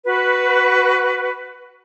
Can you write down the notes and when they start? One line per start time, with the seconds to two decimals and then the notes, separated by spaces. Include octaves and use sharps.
0.05 F#4 B4